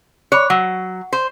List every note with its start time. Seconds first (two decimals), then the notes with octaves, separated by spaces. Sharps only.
0.32 C#5 B5 D6 F#6
0.50 F#3 F#5
1.13 C5